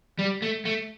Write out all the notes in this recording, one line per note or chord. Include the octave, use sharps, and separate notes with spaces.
G3
A3
A3